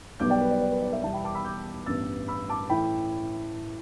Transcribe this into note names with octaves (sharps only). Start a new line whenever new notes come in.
B1 B2 G3 B3 D6 G6
D5 G5
B4
D5
D5
B4
D5
B4 E5
E2 B2 G3 E5 A5
G5 B5
A5 D6
B5 E6
D6 G6
A1 G2 G3 B3 E6 A6
B5 E6
A5 D6
A2 E3 G5 B5